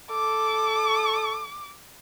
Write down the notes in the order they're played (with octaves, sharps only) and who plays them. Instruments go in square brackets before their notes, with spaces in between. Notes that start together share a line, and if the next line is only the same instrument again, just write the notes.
[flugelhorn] A4 [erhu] D6